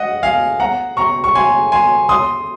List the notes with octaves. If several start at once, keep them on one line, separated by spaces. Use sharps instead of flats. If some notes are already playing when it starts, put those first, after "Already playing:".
Already playing: D#5 F#5
F5 G#5
F#5 A#5
A#5 C#6
C#6
G#5 C6
G#5 C6
C6 D#6